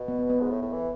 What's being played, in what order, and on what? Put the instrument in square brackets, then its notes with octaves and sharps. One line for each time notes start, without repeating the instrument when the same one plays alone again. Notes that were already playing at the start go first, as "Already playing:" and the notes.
Already playing: [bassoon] B2
[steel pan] B3
B3
B3
[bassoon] G#2
A2
A2
E3